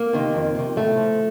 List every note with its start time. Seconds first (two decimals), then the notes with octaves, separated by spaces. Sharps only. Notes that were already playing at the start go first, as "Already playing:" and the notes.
Already playing: A#3
0.13 C3 D#3
0.35 F2
0.55 C3 D#3
0.76 A2 A3
0.97 F3